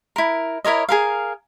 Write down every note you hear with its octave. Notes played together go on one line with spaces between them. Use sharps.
E4 A#4
E4 A#4 C#5 D#5
G#4 A#4 F5